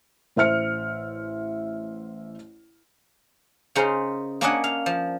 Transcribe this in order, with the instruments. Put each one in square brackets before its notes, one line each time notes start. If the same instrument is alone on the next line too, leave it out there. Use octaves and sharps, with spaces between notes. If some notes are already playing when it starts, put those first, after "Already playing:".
[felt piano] A1 C5 E5 F6 C#7
[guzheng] C#3 C#4 D#4 A#4 C5
A#3 C#4 D4 C#5 D#5 F#5
F5
F3